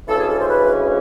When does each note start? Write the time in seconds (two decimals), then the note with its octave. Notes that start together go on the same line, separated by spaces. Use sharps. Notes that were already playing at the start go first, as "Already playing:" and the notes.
0.07 D2 C#3 E3 G#3 C#4 A4
0.18 G#4
0.29 A4
0.40 C5
0.49 B4